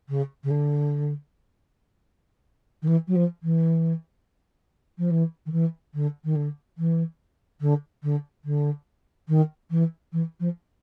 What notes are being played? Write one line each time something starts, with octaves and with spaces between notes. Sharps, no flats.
C#3
C#3
D3
D#3
E3
F#3
F3
E3
F3
E3
D#3
E3
D3
D#3
D3
E3
D3
D3
D3
D#3
E3
E3
F3